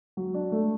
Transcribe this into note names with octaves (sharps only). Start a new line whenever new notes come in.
F#3
D4
A3